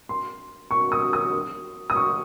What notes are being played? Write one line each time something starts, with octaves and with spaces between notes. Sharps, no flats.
C6
C#6
D#6
D#6
D#6
C#6